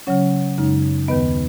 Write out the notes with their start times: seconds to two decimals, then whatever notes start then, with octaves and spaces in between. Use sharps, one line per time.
0.07 C#3 F#3 C#4 C#5 F#5
0.58 F#2 C#3 G#3 D#4
1.08 D#2 D#3 B3 B4 D#5